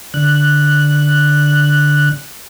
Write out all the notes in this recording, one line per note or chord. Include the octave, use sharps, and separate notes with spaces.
D3 F#6